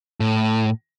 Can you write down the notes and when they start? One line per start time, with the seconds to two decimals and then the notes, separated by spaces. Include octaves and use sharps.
0.20 A2